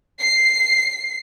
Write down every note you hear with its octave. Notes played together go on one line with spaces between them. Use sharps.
C7